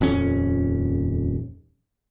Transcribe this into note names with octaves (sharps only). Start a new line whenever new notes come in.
D#1 F2 C#4